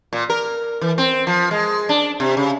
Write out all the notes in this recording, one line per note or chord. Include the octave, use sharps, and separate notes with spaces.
A#2
A#4
E3
C4
F3
G#3
D4
C3
C#3